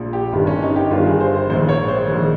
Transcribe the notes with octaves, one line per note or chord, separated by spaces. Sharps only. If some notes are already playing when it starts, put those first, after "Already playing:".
Already playing: A#1 A#2 F3
G4
G1 G2 D#3
C#4
D#4
G4
G1 G2 D#3 F4
G#4
C5
C5
A#1 G#2 D#3 C5
C#5
C5
A#1 G#2 D#3